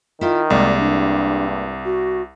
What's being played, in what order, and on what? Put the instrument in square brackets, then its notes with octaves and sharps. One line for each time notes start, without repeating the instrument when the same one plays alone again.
[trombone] D#3 [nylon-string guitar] E4 F4
[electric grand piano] C2 [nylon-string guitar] G#3 A#3 [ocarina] D5
[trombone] G2 [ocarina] D4
[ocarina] F#4